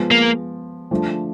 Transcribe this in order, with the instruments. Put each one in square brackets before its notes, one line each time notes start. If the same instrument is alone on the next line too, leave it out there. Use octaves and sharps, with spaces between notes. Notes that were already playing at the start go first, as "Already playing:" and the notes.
Already playing: [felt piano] F3 G#3 B3
[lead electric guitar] A#3
[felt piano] F3 A3 D4